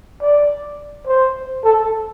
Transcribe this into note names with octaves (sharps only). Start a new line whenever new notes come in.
D5
C5
A4